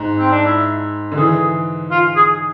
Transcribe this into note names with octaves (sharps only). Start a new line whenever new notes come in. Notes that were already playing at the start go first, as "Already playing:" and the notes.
Already playing: G#2
C4
D4
E4
D3
E3 G#4
F4
G#4